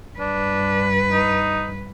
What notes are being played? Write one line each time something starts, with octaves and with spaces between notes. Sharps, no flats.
G2 D4 B4
D#4